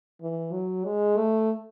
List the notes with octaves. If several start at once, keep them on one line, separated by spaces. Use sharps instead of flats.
E3
F#3
G#3
A3